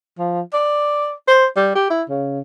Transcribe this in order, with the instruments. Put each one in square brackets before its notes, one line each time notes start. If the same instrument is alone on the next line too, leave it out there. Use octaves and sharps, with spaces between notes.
[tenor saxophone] F3
D5
C5
G3
G4
E4
C#3